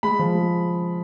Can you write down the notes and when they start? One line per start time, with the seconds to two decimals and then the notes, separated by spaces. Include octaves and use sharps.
0.03 G#3 B5
0.19 F3
0.34 G#3